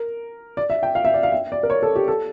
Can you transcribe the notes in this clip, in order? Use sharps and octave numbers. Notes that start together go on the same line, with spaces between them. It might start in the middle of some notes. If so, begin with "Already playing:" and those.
Already playing: A#4
D5
E5
G5
F5
E5
D5
F5
E5
D5
A#4
C#5
A4
G4
A4